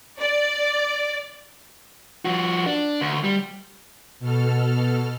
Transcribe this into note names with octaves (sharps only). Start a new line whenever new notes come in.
D5
F3 F#4
D4
D2
G3
B2 A4 F6